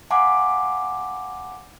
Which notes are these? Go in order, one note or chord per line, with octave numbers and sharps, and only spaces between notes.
F5 F#5 G#5 A#5 C6 D6